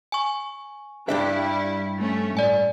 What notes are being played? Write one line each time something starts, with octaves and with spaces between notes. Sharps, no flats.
G#5 C#6
G2 G3 D4 E4 E5
A3 C#4
A2 D5 G#5